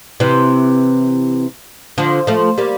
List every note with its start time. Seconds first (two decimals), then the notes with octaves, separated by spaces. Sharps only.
0.20 C3 E3
1.98 D3 F3
2.27 F3 A3
2.58 G3 A#3